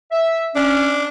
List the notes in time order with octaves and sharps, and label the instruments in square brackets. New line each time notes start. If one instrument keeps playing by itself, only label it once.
[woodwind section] E5
[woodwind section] C#4 [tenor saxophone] D4